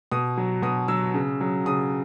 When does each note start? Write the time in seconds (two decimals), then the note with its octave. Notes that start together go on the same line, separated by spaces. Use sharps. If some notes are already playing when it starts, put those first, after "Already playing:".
0.12 B2 D#6
0.37 F#3
0.62 B2 D#6
0.88 F#3 E6
1.14 C#3
1.41 F#3
1.66 C#3 D#6